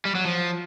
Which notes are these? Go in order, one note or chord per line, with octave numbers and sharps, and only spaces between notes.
G3
F#3
F3